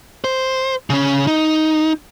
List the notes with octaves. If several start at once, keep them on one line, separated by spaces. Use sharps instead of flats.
C5
C#3 C#4
D#4